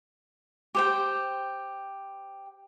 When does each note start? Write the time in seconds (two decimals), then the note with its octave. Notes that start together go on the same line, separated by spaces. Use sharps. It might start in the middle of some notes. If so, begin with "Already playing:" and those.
0.75 G4 C5 G5